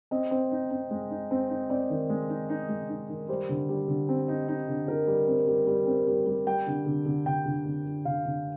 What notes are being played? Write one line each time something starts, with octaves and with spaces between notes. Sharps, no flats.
C4 D#5
C4
D#4
C4
G#3
D#4
C4
D#4
C4 D5
D#3
G#3
D#4
D#4
G#3
D#4
D#3
G3 C5
D3
G3
D3
C4
D#4
D#4
D3
D#4 A#4
G3
C4
G3
G3
C4
G3
G3
G3 G5
D3
D3
D3
D3 G5
D3
D3
D3
D3 F5
D3